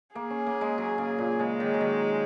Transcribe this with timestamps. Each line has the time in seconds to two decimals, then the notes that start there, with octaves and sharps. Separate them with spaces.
0.15 A#3 G#4
0.30 C#4
0.46 A#3
0.61 G#3
0.78 F#3
0.98 C#3
1.18 A#2
1.39 C#3 G#3
1.60 D#3
1.74 F#3
1.81 D#3